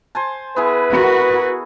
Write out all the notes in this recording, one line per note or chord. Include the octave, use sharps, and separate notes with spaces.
C5 G#5 A5
B3 E4 G#4 B4
F#4 A#4